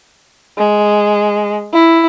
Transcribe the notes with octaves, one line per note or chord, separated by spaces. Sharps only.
G#3
E4